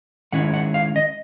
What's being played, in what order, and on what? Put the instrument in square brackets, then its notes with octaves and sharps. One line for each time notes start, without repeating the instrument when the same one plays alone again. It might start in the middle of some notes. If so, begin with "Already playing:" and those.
[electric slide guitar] D#3 G#3 C#4 E4 F#5
F#5
F5
D#5